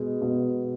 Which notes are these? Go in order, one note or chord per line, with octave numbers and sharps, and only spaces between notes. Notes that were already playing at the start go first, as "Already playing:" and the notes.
Already playing: B2 G#3
B2